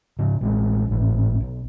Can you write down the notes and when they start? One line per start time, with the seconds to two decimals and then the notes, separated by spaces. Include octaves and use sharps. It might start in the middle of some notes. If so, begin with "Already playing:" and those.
0.19 G#2 C#3
0.41 A1 G#3
0.88 G#1 A2
1.40 B1